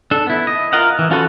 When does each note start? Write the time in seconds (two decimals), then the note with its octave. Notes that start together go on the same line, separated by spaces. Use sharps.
0.11 D4 A4
0.27 B3 E4
0.47 D#5
0.73 F4 A#4 D#5 F5 F#5
0.99 E3
1.11 C#4 F4 F#4 A4 B4